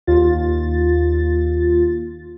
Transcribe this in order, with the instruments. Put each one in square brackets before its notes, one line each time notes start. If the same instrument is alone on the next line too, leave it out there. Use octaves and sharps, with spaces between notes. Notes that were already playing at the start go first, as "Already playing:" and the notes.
[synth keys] D#2 F4 A6